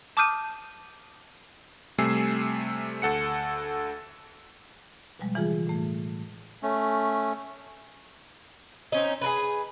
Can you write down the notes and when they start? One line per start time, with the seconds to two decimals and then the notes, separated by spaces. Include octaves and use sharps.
0.17 A5 D6 D#6 F6 G6 D#7
1.98 C3 G3 A3 G#5 E6 C7
3.02 D2 A4 F#5 C#7
5.19 B2 F3 G3 G#3
5.35 C#3 E3 G#3 F4 G#4
5.67 A2 A3
6.63 A3 C#4
8.92 C4 C#4 D#4
9.21 G#4 A#4 B4